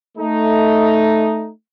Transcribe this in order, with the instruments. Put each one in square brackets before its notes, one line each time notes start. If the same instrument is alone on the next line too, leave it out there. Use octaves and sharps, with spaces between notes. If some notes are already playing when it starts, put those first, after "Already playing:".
[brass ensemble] A3 D#4